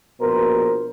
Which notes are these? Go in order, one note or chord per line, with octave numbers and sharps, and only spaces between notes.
A#1 B2 A#4 C5